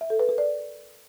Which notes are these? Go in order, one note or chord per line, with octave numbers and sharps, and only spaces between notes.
E5
A4
B4
A#4
D5